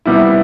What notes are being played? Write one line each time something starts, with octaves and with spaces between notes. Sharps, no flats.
C3 G3 B3 E4